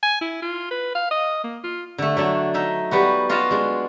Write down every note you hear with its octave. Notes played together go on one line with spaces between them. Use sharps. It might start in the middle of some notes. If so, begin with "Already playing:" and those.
G#5
E4
F4
B4
F5
D#5
A#3
F4
D3 A3
F#3 A3 D4
D#4 E5
G3 B3 F#4
F4 F#4 D#5 F5 A5
G#3 D4